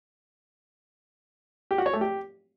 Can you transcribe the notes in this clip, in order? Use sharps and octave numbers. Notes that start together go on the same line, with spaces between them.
G4
F#4
C#5
A3
G4